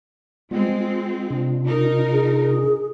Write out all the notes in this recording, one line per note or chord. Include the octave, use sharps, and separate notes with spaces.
G3 G#3 B3 C4 F4
F4
C3 D4 F4
D#4 A#4
G#4